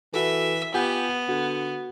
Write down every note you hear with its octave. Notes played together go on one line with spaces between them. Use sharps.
E3 F#4 A4 E5
B3 F4 G4 F#5 G#5
D3 F#4